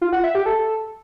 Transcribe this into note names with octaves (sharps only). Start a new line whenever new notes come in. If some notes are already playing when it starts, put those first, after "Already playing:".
F4
F#5
E5
G4
A4